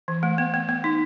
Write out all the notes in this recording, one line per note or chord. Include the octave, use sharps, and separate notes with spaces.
E3
A3
B3
B3
B3
D#4